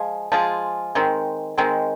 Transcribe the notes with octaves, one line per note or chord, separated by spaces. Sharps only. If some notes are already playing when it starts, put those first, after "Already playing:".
Already playing: F3 G#3 F4 G#4
F3 G#3 F4 G#4
D#3 G#3 C4
D#3 G#3 C4